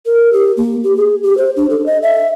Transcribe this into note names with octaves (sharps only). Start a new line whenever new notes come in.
A#4
G4
A#3
G4
G#4
G4
C5
D4
A4
D#5
E5